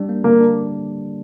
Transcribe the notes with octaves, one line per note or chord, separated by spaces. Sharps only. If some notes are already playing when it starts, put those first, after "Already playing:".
Already playing: G3 D4
A#3
D3 A#3
D4